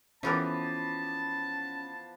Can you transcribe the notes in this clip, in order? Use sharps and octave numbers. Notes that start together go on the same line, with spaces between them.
E3 F3 B3 C#4 A4 A#4 A5 D6